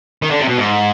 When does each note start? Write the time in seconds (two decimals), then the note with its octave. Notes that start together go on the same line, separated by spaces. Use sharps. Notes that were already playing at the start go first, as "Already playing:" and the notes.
0.22 D#3
0.31 D3
0.40 C3
0.48 B2
0.57 G#2